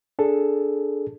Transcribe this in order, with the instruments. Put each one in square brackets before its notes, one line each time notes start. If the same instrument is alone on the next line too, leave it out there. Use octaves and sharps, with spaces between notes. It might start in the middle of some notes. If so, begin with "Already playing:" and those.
[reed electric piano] D4 G#4 A4